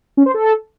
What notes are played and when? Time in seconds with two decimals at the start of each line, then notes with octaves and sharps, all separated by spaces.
0.17 C#4
0.26 C5
0.34 A4